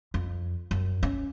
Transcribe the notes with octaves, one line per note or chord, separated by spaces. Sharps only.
F2
F#2
C#4